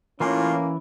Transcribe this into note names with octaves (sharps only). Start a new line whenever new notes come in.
A2 E3 A#3 C#4 F4 G#5 D6